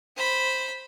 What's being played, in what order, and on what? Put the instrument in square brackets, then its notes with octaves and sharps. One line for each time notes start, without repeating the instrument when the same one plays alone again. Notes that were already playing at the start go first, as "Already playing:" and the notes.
[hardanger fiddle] C5 B5